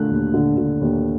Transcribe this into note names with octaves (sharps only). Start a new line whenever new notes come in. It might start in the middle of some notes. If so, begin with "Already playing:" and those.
Already playing: D3 A3 F#6
D#2
D3
D3
D#2